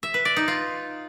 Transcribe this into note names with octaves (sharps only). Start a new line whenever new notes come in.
E5
B4
D5
D#4
F4